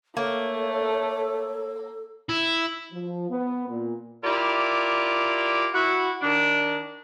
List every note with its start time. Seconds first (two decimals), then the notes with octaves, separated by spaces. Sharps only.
0.17 A3 A#3 A4 C#5
2.29 E4
2.93 F3
3.30 B3
3.68 A#2
4.22 E4 F4 G4 A#4 D5
5.74 E4 F#4
6.22 D#3 D4